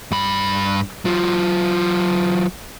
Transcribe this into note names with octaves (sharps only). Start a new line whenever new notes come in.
G2 B5
F#3 F4